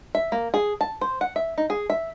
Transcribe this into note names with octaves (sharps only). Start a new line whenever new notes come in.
E5
A#3
G#4
A5
C5
F#5
E5
D#4
G#4
E5